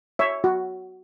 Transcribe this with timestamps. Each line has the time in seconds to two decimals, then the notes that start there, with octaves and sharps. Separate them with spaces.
0.19 C#5 E5
0.44 F#4